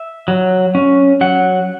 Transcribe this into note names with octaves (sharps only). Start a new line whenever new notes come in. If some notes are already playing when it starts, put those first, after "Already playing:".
Already playing: E5
F#3
C#4
F#3 F#5